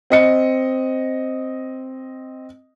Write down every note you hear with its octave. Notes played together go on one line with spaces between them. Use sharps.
C4 D#5 C#7